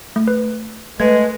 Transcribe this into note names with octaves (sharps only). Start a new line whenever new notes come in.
A3
B4
G#3 A3 B4 G#6